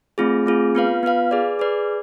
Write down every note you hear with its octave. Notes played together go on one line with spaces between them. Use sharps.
A3 C4 F4 G#4
A3 C4 F4 G#4
B3 F4 B4 F5
B3 F4 B4 F5
G#4 B4 D5
G#4 B4 D5